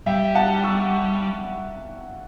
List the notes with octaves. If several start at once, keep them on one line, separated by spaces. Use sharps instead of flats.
G3 E5 G5
F#5 A5
C#6 E6